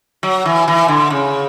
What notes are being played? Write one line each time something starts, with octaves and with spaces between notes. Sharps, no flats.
F#3
E3
E3
D3
C#3